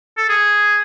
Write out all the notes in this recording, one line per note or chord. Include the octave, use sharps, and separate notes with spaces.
A4
G#4